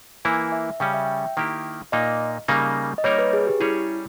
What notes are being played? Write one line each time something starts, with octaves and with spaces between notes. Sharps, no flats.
E3 A#3 E4 G#5
E5
C#3 G3 C#4 G5
E5
G5
D#3 A#3 E4 G4
A#2 A#3 D#4 D#5
C#3 G3 A#3 D#4
D#5
G3 A#3 D#4 A#4 C#5
B4
G#4
G4
G3 C#4 E4 G#4 C#5